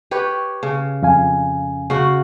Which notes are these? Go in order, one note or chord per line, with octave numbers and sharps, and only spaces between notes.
G4 B4 C#5
C#3
F2 F5 G#5
C#3 F#4